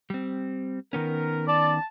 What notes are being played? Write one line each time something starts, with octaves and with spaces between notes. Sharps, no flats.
G3 C4
D#3 B3 C#4 A#4
D5 A5